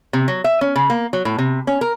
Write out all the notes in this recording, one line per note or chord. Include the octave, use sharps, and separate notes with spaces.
C3
F#3
E5
C#4
C#3
A#3
F#3
A2
C3
C#4
A#4